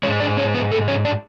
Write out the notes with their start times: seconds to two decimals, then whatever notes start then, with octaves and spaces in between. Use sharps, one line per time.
0.03 G#2 F3 G#3 C#4 C#5
0.20 D4 D5
0.37 C#4 C#5
0.54 B3 B4
0.72 A3 A4
0.88 C#4 C#5
1.05 D4 D5